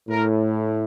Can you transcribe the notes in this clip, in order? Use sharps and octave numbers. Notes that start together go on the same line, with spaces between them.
A2 A#4